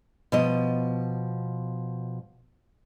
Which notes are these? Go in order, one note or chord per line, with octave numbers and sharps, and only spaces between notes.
B2 F3 D#5